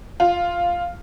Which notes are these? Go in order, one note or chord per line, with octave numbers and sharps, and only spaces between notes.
F4